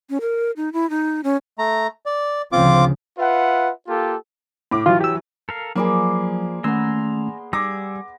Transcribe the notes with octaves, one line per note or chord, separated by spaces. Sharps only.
C#4
A#4
D#4
E4
D#4
C#4
A3 A#5
D5
D2 C#3 F3 C4 F4 D6
F4 B4 E5 F#5
A#3 F4 G4 A4
A2 D6
E3 F#3 F4
G4 E6
A4 A#4 F5
F3 F#3 A#3 G#4 D5 B5
D#3 A3 B3 C#4 G#5 A#5 C6 E6
G3 G#4 D6 E6 A#6